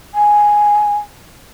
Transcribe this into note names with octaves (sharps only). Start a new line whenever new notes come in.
G#5